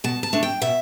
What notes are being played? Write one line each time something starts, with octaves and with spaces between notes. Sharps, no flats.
B2 A5
A5
A3 D4
G5
B2 E5